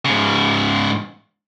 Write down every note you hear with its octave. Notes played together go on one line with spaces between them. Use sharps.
G#2 C#3